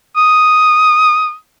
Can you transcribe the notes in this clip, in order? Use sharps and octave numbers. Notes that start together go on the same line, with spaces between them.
D#6